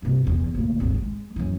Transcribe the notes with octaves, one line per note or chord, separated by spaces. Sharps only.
G2 C3
G1 E2
D2 A#2
G#1 D#2
G#3
F#2 E3